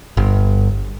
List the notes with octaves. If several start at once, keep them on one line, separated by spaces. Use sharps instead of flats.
G1